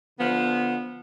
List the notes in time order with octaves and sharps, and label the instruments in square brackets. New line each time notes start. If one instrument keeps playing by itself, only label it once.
[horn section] D3 F3 B3